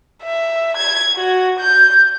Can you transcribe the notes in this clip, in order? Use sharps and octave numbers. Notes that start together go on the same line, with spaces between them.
E5
G#6
F#4
G6